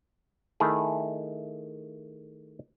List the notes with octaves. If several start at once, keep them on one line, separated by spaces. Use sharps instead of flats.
D#3 A3 E4 G#4